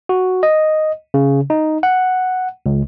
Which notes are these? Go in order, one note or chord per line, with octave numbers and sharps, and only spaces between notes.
F#4
D#5
C#3
D#4
F#5
C#2